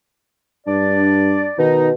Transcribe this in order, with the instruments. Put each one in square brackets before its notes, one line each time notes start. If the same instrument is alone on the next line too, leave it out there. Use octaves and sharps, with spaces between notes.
[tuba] G2 [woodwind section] D4 D5
[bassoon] B2 [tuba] D#3 [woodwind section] D#4